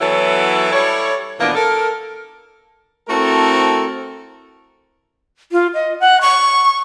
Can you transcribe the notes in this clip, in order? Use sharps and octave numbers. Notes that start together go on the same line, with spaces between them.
E3 F#3 B3 E4 A4 C#5
G3 E4 A4 C#5
B2 E3 F3 A#3 B3 D4
A4 A#4
A3 C4 E4 F#4 A4 A#4
F4
D#5
F#5
C#6